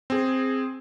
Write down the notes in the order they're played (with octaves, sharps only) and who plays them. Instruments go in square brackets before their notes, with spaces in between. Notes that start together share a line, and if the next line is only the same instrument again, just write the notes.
[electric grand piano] C4 G#4